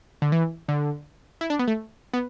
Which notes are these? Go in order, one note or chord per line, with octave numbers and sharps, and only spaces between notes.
D3
E3
D3
E4
D4
B3
A3
B3